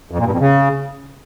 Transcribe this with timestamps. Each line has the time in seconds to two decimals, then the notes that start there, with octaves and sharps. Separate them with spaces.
0.11 F2
0.19 A#2
0.26 G2
0.33 F2
0.40 C#3